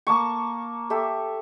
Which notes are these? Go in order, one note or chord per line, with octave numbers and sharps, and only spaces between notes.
A#3 A5 C#6
G4 A4 E5